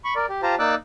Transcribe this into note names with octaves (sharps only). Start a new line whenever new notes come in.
B5 C#6
A#4 D5
G4
F4 G4 C5 A5 A#5
A#3 D#4 D5 D6 E6 F#6